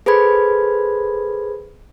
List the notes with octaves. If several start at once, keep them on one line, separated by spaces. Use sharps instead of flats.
G#4 A4 B4 C5 B5 G#6